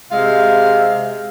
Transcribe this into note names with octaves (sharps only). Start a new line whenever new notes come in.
C3 G#3 E5 F5